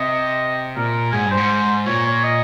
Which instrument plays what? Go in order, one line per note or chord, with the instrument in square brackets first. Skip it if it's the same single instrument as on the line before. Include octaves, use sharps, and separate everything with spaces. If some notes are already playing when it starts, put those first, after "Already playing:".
Already playing: [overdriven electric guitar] C3 [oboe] D#5
[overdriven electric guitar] A#2 [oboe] A#4
[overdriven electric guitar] G#2 [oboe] G#4
[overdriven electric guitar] G2
[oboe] C5
[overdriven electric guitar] G#2
[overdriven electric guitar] A#2 [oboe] C#5
[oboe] C#5
D#5